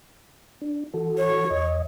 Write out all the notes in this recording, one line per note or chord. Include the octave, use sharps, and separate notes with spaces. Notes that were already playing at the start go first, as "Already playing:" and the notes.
D4
E3 F#4 A4
C#5
E2 D#5